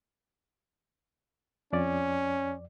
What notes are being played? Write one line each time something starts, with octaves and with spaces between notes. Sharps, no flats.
F2 C#4 D5